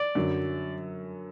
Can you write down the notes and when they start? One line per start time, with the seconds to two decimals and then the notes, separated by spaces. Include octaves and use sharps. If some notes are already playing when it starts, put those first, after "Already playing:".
Already playing: D5
0.15 F#2 D3 F#3